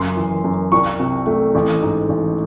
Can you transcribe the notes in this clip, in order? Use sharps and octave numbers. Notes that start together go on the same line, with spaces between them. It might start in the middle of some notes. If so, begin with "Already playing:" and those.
Already playing: F#1 F#2 C6
E3
F#2
C2 C#6
C3
A3
A1
G#2
A1